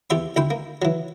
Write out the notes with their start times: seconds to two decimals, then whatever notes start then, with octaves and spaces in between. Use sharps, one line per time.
0.10 E2 G4 E5 C6
0.36 D2 E4 G5 C6
0.51 A#3
0.82 E3 F#3